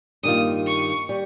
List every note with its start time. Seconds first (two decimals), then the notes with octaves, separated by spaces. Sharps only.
0.23 G2 D#3 A#3 F4 D#6
0.66 C#6
1.09 G3